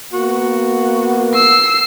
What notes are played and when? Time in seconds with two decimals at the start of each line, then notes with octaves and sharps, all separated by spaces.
0.13 A#3 B3 F#4
1.35 E6 C7